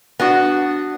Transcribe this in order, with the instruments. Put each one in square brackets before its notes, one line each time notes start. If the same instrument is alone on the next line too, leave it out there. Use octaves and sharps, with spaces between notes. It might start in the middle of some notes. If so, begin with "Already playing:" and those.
[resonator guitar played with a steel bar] B3 D4 F#4